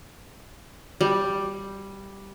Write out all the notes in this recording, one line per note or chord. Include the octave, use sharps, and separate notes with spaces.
G3